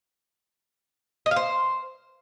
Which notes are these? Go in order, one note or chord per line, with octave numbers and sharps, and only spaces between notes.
D#5
F5
C5